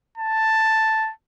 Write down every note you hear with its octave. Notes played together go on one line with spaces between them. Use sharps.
A5